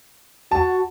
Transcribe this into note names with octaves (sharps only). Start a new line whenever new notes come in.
F#4 A5